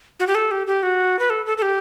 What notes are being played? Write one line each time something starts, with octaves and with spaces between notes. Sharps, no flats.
F#4
G4
A4
G4
G4
F#4
B4
A4
A4
A4
G4